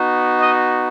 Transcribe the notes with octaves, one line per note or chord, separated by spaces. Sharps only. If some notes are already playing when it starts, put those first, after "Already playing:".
Already playing: B3 D#4 F#4
D#5